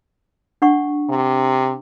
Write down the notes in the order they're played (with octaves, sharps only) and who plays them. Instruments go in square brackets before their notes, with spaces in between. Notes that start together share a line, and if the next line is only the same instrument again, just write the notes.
[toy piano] D4 F#5 C#6
[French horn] C3